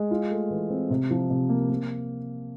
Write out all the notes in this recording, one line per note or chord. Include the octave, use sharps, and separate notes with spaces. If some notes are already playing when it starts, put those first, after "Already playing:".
Already playing: G#3
F4
A3
E3
C4
C3
F3
C3
A#3
A#3